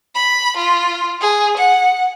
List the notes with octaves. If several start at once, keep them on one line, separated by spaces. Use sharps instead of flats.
B5
F4
G#4
F#5